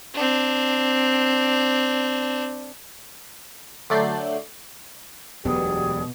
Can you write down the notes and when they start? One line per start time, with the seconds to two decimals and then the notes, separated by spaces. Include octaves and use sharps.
0.15 C4 D4
3.90 D3 F#3 A3 D5 G6 C7
5.45 E1 D2 B2 F#3 G4 G#4 D5 D#6